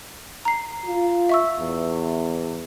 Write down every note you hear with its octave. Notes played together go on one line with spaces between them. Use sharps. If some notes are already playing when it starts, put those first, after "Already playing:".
A#5 C7
F4
E5 C#6 E6
E2